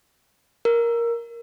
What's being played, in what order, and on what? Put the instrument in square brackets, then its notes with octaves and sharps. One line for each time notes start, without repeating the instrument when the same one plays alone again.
[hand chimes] A#4